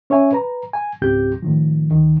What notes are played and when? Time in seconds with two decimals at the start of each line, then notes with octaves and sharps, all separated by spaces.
0.10 C#4 C#5 E5 G#5
0.32 B4 A#5
0.73 G#5
1.02 C#2 G#2 C4 G4 G6
1.42 A2 D#3 F3
1.91 D2 D#3